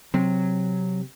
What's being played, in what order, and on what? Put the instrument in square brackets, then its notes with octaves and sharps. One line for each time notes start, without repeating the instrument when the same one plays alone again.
[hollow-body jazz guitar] C3 [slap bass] F#3